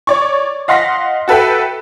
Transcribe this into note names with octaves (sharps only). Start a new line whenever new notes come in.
C#5 D5 C#6
D#5 F5 F#5 C6 A#6 B6
F#4 A4 B4 E5 G5